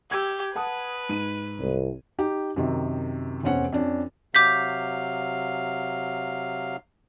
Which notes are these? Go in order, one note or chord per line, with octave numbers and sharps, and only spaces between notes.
G4 E6 G#6
B4 F#5 A5 D#6
G#2 D#7
C2
D#4 G4
F#2 C3 D#3
F1 E2 C4 C#4 F#5
F2 C#4 D4
C3 F#3 F5 D6 G6 B6